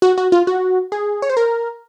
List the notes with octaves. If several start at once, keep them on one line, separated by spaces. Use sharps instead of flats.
F#4
F#4
F4
F#4
G#4
C#5
C5
A#4